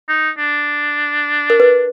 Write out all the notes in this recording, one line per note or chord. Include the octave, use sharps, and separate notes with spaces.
D#4
D4
A#4
B4